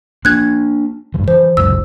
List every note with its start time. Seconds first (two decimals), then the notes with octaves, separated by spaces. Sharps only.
0.25 A#3 D4 F#6 G#6
1.14 G2 E3
1.28 E3 C5
1.57 F1 C#2 F#2 E6